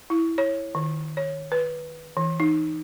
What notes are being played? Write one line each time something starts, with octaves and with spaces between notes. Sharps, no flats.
E4
C#5
D#3
C#5
B4
E3
D#4